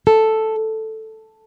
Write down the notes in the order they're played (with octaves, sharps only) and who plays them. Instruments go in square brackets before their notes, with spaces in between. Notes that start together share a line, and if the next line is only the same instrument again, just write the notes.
[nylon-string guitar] A4